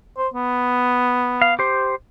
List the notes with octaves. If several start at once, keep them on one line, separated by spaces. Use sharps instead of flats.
C5
B3
F5
G4 C5